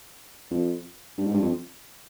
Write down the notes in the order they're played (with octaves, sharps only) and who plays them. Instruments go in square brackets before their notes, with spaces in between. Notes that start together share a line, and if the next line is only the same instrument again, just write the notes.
[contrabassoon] F2
G2
G#2
G2
F2